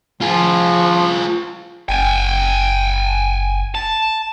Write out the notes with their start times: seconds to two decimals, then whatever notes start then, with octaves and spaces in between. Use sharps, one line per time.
0.21 F3 F4 G#4
1.89 F#1 G5 G#5
3.75 A5